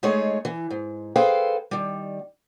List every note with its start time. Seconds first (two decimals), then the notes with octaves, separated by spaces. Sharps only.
0.03 G#3 A3 D#4 G#4 C#5
0.45 E3
0.70 G#2
1.16 G#4 A4 B4 C5 F5 G5
1.71 D#3 G3